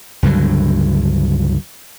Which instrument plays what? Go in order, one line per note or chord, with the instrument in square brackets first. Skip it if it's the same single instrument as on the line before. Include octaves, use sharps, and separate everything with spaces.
[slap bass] C#2 G2 D3 F#3